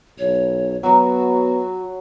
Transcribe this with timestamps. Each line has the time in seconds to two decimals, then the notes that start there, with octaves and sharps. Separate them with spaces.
0.19 B1 C#5
0.83 F#3 B3 F#4